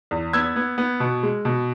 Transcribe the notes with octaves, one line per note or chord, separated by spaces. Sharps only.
E2
B3 E6 G#6
B3
B3
B2
G#3
B2